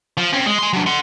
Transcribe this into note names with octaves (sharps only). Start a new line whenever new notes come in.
F3
C4 C#4
G#3
G#5 C6
F#3 D4
F#5 C6